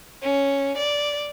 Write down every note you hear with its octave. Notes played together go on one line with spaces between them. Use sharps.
C#4
D5